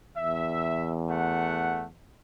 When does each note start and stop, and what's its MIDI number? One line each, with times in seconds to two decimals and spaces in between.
0.16 1.92 40
0.16 0.94 76
1.10 1.84 57
1.10 1.84 78